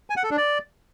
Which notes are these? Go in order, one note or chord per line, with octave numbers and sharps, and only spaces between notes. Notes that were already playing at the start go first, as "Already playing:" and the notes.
G#5
F#5
A4
D4
D5